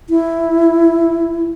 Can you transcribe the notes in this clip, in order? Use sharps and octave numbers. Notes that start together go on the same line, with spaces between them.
E4